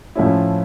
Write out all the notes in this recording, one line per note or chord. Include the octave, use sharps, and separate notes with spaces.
A2 F3 A3 C#4 E4